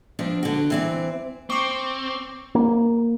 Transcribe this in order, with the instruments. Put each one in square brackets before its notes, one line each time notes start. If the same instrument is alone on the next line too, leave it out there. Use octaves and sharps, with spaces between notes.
[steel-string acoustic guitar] F3 C4 D4
D3 F#4
E3 C4 D5
[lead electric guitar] C4 [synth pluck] C#6 D6
[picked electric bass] A#3